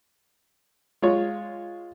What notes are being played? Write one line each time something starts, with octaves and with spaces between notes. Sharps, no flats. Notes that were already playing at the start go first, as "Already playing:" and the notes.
G#3 F4 C#5